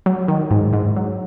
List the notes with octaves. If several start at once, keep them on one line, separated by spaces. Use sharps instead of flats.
F#3
D#3
G#2
G#2
F#3